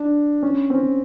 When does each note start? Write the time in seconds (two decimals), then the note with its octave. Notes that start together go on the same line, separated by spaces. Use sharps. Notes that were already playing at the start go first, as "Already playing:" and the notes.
Already playing: D4
0.43 C#4
0.70 C4
0.74 C#4